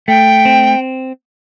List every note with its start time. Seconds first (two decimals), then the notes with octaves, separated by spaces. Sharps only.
0.08 A3 G5
0.45 C4